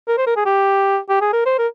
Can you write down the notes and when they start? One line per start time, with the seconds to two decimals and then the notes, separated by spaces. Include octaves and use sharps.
0.08 A#4
0.17 C5
0.27 A#4
0.37 G#4
0.46 G4
1.09 G4
1.21 G#4
1.33 A#4
1.46 C5
1.59 A#4